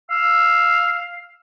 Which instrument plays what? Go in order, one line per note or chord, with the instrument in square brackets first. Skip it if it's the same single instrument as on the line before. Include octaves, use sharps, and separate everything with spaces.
[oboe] F5 [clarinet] E6